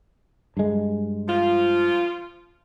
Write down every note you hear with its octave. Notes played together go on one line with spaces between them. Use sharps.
G2 G#3
F3 F4